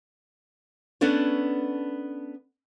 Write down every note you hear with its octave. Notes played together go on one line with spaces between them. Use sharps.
B3 C#4 D4 A4 C#5